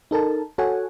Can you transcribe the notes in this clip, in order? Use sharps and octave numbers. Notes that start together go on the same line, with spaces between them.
D#4 A4 A#4 A5
F#4 A4 C#5 F#5 G#5